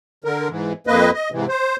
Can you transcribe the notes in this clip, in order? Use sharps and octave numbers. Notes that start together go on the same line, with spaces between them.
D3 A#4
G#2 E3
F2 A#3 B4 D#5
D#5
G#2 C3 E3
C5